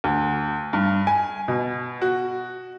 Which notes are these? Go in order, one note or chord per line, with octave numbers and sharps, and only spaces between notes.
D2
G2
G#5
B2
F#4